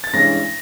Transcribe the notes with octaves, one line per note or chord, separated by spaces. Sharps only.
A6
G2 E3 G#3 C#4 A#6